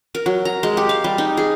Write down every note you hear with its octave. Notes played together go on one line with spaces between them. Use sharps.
A#4
F#3
A#5
G#3
G4
F5
G3
D#4
G#4